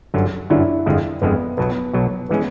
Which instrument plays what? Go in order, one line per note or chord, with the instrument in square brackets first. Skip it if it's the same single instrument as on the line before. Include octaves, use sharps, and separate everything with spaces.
[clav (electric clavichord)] G1 F#2 D3 F#3
[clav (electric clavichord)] G1 F#2 D3 F#3 [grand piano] D4 E4
[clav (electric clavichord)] G1 F2 D3 F3 G#3
[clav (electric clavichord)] G1 F2 D3 F3 G#3 [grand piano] B3
[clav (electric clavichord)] B1 B2 F#3 [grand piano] B3
[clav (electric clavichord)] B1 B2 F#3
[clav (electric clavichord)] E3 G#3 C#4 [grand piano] B3